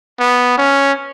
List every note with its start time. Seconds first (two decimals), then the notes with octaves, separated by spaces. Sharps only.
0.20 B3
0.58 C#4